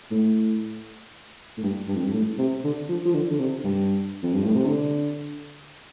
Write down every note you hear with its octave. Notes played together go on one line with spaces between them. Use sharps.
A2
A2
G2
G2
F2
G2
A2
C3
D3
F3
F3
D3
D3
C3
G2
F2
G2
A2
C3
D3